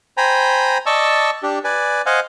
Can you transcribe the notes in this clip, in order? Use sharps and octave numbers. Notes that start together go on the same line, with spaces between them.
C5 G5 G#5 A#5 B5
D5 D#5 A5 C#6 E6
D4 G4
B4 D5 G#5
C5 D#5 F5 F#5 G#5